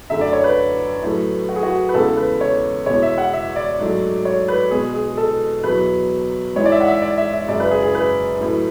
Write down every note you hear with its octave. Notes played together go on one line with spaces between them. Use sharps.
F#2 D3 A3 E5
D5
C#5
B4
A2 F#3 A3
F#4
G#4
F#4
B4
E2 C#3 G#3 A4
B4
C#5
E2 B2 G#3 C#5
E5
F#5
E5
D5
G#2 F#3 A3
C#5
B4
B2 G#3 G#4
G#4
A4
E2 B2 F#3 B4
G#2 E3 G#3 C#5
D5
E5
F#5
E5
D5
E5
E5
F#2 C#3 G#3 D5
B4
G#4
G#4
B4
A2 F#3 A3